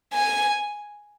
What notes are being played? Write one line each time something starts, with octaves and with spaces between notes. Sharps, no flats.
G#5